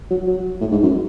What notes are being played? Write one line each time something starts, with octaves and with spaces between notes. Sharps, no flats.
F#3
F#3
A2
G#2
F#2